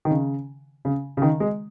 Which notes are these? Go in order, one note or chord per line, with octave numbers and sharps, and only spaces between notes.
D#3
C#3
C#3
C#3
D#3
G#3